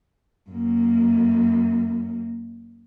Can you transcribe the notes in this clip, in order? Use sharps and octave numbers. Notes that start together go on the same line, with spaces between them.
F#2 A#3